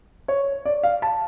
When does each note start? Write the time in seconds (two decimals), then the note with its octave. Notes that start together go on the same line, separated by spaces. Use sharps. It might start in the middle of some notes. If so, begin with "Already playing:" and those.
0.28 C#5
0.65 D5
0.83 F5
1.02 A5